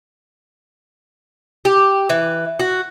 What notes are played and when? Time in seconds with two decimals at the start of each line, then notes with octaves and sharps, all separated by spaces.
1.65 G4
2.09 E3
2.60 F#4